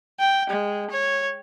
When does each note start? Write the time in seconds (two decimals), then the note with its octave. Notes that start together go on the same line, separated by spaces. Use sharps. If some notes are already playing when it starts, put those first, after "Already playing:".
0.20 G5
0.50 G#3
0.91 C#5